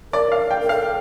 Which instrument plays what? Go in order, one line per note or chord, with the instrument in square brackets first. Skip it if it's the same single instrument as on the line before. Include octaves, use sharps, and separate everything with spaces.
[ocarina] A#4 [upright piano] D5
[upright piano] F5
G5
[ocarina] A#4
[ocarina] A4 [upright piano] F5